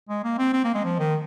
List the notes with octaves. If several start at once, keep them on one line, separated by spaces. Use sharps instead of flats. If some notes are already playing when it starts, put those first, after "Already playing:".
G#3
A#3
C4
C4
A#3
G#3
F3
D#3